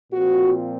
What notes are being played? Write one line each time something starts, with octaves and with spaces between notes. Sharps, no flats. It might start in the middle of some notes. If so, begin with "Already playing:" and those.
A#2 F3 C4 F#4